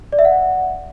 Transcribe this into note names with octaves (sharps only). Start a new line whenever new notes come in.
D5
E5
F#5